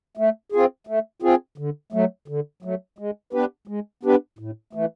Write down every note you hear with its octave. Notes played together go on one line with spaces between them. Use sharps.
A3
C4 F4 G#4
A3
C4 F4 G#4
D3
F#3 A3
D3
F#3 A3
G#3
B3 D4 G4 B4
G#3
B3 D4 G4 B4
A2
E3 A3